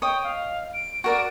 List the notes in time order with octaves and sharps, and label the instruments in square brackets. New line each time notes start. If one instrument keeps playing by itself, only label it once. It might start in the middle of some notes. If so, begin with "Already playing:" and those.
[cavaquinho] C#5 D#5 D#6 [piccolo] G5
[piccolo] F5
D7
[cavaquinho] F#4 A#4 D5